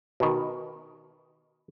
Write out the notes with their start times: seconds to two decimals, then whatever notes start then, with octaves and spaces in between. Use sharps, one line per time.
0.20 B2 D#3